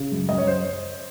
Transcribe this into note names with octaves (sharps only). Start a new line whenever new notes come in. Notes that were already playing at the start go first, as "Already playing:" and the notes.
Already playing: C#3
F#2
F#2 D#5
C#5
C5